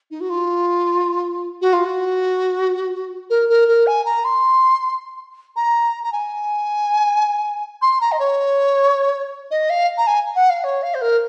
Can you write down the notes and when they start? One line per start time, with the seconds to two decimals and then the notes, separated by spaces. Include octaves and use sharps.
0.11 D#4
0.20 F#4
0.30 F4
1.61 F#4
1.73 F4
1.85 F#4
3.30 A#4
3.49 A#4
3.68 A#4
3.87 G#5
4.05 A#5
4.25 C6
5.56 A#5
6.03 A#5
6.12 G#5
7.82 C6
8.01 A#5
8.12 D#5
8.19 C#5
9.51 D#5
9.70 F5
9.98 A#5
10.07 G#5
10.35 F#5
10.50 F5
10.64 C#5
10.83 F5
10.94 C5
11.01 A#4